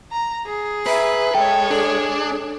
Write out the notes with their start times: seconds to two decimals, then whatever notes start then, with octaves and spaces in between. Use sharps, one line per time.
0.11 A#5
0.46 G#4
0.86 B4 E5 A#5
1.35 G#3 A4 C#5 G5
1.71 D4 G#4 A4